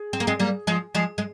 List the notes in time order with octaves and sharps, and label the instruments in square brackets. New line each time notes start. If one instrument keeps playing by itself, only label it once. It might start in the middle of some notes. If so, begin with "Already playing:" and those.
Already playing: [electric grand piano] G#4
[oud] C4
A#3
G#3 C4
G3 A#3
F3 G#3
F3 G#3
G#3